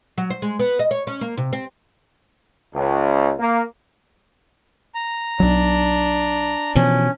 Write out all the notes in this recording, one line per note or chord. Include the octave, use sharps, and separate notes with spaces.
F#3
C5
G#3
B3
D#5
C#5
C#4
A#3
C3
C4
C#2
A#3
A#5
B1 F#3 D4
B2 E3 F3 C#4